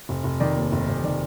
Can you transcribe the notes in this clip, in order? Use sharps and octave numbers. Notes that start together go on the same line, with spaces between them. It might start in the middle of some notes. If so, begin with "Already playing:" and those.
F1
F1
D#3 D5
D#2
F1
F1
D#3 D5